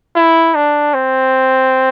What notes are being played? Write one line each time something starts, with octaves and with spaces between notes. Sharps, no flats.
E4
D4
C4